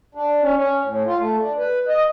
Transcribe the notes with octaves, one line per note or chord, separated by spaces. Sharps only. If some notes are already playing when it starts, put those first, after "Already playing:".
D4
C#4
C#4
A2
F4
A3
D4
B4
D#5